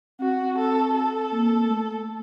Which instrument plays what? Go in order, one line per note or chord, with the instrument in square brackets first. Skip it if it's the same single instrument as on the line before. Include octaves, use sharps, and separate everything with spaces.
[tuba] C4 [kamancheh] F#4
[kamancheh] A4
A4
[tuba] A#3
A3